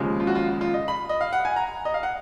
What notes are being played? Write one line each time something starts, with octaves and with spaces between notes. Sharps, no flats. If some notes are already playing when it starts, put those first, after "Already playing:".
Already playing: D#2 C#3 F3 G#3
F4
F#4
F4
F4
D#5
B5
D#5
F5
F#5
G#5
A#5
D#5
F5
F#5